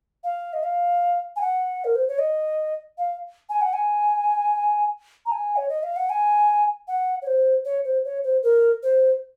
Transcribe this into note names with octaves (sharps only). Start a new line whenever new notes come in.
F5
D#5
F5
G#5
F#5
A#4
C5
C#5
D#5
F5
G#5
F#5
G#5
A#5
G#5
C#5
D#5
F5
F#5
G#5
F#5
C#5
C5
C#5
C5
C#5
C5
A#4
C5